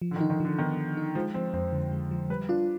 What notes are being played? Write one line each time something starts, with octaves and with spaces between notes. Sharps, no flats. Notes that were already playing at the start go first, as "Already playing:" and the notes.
F3
D3
D#3
D#4
D#3
D3 F3
D#3 B3
F3
D#4
F3 G#3
F3 C4
F2 C4
D3
G#3
F3
G3 B4
D4 F4